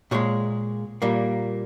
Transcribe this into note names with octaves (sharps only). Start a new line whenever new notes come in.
A#2 G#3 C#5
A#2 G3 A#3